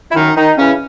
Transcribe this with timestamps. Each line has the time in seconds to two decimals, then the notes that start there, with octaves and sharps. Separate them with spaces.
0.12 E4
0.15 F#2 D#3 D#4
0.36 D#3 D#4
0.58 C#3 E3 C#4